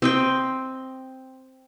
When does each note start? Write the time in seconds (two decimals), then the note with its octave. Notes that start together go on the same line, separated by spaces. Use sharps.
0.02 C4 D#5 G5